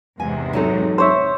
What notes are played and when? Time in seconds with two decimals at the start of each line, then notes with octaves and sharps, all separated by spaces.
0.20 E2 G#2 C3 G#5
0.53 F#3 D#4 A4
0.98 C5 C#5 E5